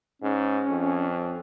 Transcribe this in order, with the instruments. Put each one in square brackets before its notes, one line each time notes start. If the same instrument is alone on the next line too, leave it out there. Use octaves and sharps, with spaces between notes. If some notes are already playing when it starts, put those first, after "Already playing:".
[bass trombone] G#2 [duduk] C#4
[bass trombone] F2